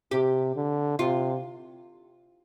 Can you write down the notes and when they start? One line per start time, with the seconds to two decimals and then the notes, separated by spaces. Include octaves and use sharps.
0.11 C3 G4
0.56 D3
0.99 C3 F4